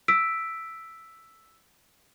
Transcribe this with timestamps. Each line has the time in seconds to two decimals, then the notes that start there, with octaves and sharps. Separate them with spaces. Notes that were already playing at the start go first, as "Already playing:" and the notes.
0.08 E6 B6 D7